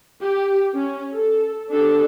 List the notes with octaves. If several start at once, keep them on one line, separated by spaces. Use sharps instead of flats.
G4
C#4
A4
D4 G4 A4